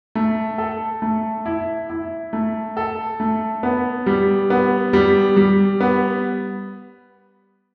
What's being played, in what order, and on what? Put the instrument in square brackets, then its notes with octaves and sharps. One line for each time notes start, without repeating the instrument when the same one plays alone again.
[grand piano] A3
A4
A3
E4
E4
A3
A4
A3
B3
G3
B3
G3
G3
B3